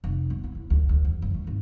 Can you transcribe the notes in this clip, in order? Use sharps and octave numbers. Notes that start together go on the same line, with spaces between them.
F1
B3
E4
D2
D2
D2
E2
F#1
A3
G#1